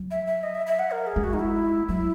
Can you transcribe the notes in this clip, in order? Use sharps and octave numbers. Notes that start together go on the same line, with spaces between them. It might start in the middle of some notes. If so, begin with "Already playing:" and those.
Already playing: F#3
E5
E5
D#5
E5
E5
F#5
A#4
G#4
G#3
F#4
D#4
E4
F#3 E4